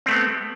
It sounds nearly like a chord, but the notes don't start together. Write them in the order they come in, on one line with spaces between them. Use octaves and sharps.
C4 A3 B3